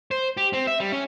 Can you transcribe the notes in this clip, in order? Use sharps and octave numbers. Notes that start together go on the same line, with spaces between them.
C5
G4
C4
E5
G3
C#4